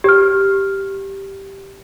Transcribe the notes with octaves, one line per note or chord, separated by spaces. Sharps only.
G4 F6